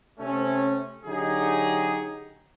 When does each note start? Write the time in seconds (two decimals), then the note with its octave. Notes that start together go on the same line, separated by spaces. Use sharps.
0.19 C3 A3 C4 C#4
1.05 D3 F#3 D#4 G4 G#4